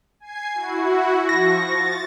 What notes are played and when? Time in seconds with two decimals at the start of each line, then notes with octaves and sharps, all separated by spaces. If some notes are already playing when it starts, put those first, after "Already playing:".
0.20 G#5 G#6 C7
0.54 E4 F#4
1.29 F3 C#6 A#6
1.65 A6